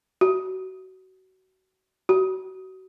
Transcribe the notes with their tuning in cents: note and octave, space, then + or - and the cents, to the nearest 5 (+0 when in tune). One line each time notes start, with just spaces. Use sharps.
F#4 +25
F#4 +30